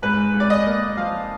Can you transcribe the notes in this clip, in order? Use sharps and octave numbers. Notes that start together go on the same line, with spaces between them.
G#2 B4
G#2
D5
D#5
A#3
F3 F5